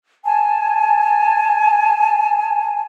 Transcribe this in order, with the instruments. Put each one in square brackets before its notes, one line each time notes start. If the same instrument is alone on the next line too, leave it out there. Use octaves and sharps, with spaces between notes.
[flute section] G#5 A5